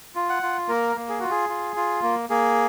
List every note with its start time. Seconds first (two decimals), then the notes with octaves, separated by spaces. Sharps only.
0.15 F4
0.29 F#5
0.43 F4
0.69 A#3 A#4
0.96 A#3
1.09 G#4
1.20 F4 F#4
1.31 G#4
1.49 F4
1.76 F4
2.03 A#3
2.29 A#3 G#4